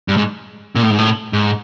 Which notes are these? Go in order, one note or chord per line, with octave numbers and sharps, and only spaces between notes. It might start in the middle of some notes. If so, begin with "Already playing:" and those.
G2
G#2
A#2
A2
G#2
A2
G#2